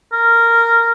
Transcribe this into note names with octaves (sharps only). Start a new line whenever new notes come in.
A#4